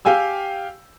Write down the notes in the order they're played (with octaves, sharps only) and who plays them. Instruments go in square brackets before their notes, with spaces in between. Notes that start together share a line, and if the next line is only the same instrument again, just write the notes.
[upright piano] G4 F5 G5 G#5 E6